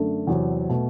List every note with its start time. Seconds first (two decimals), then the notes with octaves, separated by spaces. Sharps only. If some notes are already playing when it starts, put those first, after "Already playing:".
Already playing: F#2 D3 A3 D4 A4
0.27 E2 C3 F#3 C4
0.69 B2 A3